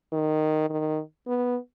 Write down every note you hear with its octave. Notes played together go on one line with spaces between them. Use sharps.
D#3
D#3
B3